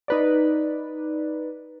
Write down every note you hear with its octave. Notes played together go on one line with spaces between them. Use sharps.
D#4 B4 D5